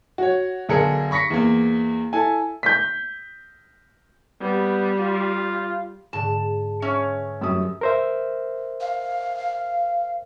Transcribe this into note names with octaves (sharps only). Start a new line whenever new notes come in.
F#4 C#5
B1 D3 G#4 A#4 C#7
B5 C#6 A#6 B6 C#7
E2 A#3
E4 A4 G#5
G6 B6
G3 B3
F4
G#2 D3 A5
C#4 B4 C#5 E5
F#2 G3 D#6 E6
A#4 C5 E5
F5